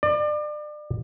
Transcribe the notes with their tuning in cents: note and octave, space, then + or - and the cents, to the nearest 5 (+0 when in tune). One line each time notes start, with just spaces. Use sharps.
D5 +30